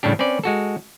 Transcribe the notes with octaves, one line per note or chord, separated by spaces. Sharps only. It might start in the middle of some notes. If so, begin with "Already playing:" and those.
A2 C#3 G3 D4 G4
C4 C#4 B4 D5
G#3 F#4 A4